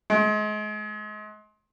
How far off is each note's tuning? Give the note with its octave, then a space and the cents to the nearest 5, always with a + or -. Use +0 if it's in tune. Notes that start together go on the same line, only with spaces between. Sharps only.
G#3 +35